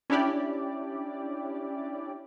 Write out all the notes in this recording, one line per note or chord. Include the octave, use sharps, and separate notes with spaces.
C#4 D4 E4 G4 D5